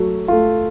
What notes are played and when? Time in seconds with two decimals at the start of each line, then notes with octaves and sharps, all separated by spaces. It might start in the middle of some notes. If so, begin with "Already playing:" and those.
Already playing: F#3 A3
0.28 A3 F4